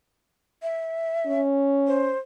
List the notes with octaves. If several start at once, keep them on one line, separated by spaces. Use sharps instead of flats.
E5
C#4
C5